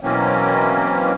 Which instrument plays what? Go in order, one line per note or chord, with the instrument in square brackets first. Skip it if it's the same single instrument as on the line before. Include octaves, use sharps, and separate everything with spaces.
[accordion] B2 E3 F#3 A#3 C4 C#4